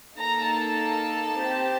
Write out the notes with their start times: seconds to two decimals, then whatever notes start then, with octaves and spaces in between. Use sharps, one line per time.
0.17 A#3 D#4 A4 A#5
0.48 A5
1.41 C4 G4